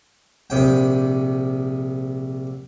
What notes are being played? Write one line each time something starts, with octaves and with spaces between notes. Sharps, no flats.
A#1 C3 G5